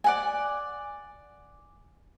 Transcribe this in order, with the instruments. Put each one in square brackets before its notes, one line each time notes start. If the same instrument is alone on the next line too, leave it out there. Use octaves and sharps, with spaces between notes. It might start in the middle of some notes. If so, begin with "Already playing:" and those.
[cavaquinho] D5 F#5 G#5